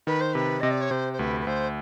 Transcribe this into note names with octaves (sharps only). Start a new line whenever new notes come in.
D#3 B4
C5
C3 B4
C3 D#5
D5
C#5
C3 C5
C5
D2 B4
B4
D2 C5